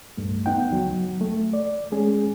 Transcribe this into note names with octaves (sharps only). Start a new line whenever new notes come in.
C2 G2 A3
B3 D#4 F#5 G5
C#2 F#3
A3
D5
G#3 C#4 G#4